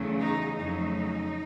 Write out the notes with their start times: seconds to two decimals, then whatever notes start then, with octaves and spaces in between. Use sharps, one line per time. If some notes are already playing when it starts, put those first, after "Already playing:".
Already playing: E2 C#3 F#3 A3
0.19 D#4
0.58 F2 C#3 F#3 A3 D#4